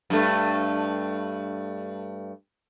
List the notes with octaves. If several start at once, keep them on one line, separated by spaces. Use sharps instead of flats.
G2 A3